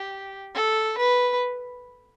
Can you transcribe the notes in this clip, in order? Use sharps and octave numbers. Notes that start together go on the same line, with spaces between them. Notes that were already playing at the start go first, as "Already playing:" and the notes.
Already playing: G4
A4
B4